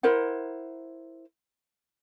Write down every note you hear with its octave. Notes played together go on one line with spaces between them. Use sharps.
E4 A#4 C5 F#5